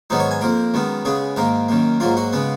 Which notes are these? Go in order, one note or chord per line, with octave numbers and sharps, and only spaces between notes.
G#2 D#3 F#3 B3 D#4
C#5
G#5
F2 F3 A#3 A#4
F#2 D#3 G#3 B3
C#3 G#3 B3 G#4
G#2 D#3 A#3 A#4
F#2 D#3 A#3
G#2 F#3 A#3 F4
F#4
C#3 G#3 B3